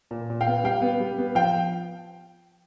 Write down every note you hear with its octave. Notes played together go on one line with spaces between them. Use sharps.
A#2
A#2
F5 G5
B3
G3 F5 G5
B3
G3
B3
F3 F5 G5